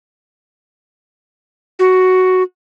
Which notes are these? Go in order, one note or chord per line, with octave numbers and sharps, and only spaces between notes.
F#4